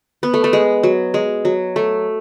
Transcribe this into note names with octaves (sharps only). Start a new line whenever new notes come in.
B3
A3
A3
G#3
F#3
G#3
F#3
A3